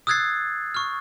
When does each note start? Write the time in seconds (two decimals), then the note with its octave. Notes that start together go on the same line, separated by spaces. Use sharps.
0.07 D#6 E6 F#6 G#6 A6 C7
0.74 C#6 F6